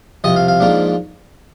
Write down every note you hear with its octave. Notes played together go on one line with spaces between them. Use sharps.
C2 C3 F3 D#5
F5
F5
G#2 F3 A#3 D4